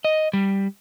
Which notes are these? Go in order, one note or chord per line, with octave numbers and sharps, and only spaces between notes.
D#5
G3